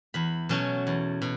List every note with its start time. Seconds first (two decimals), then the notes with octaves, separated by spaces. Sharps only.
0.14 E2 B5
0.49 B2 F#3 A3 C#4
0.87 E2
1.22 B2